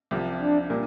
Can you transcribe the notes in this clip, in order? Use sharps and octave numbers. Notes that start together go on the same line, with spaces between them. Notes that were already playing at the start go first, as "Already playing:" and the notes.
C2 C3 F3
D4
A#2 G3 A#3